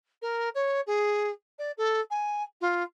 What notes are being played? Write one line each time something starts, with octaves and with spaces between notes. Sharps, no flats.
A#4
C#5
G#4
D5
A4
G#5
F4